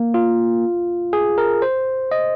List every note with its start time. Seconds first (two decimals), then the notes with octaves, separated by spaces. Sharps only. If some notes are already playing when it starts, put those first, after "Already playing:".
Already playing: A#3
0.14 F4
1.13 G#4
1.38 A#4
1.62 C5
2.12 D#5